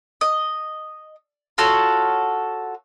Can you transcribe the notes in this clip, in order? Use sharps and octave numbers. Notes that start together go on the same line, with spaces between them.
D#5
F4 F#4 A4 C#5